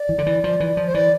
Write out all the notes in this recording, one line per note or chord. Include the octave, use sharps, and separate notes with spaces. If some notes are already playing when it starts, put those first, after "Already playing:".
Already playing: D5
E3
D3
E3
F3
E3
F3
C5
E3 D5